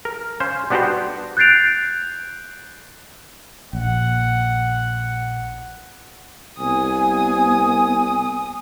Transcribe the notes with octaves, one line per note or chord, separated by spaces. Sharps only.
A#4
C#4 C5 F5
G3 B3 D4 F#4 G4 C5
F#6 G6 A6 C7 D7 F7
A#1 F#5
C2 B3 G#5 D#6